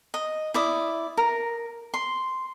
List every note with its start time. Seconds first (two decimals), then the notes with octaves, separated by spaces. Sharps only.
0.14 D#5
0.54 E4 D5 D#6
1.17 A#4
1.94 C6